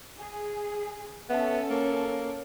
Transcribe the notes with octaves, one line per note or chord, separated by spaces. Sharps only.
G#4
B3 C#4 A4 E5
A#3 A#4 C#5